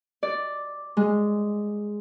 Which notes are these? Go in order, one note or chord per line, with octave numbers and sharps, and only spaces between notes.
D5
G#3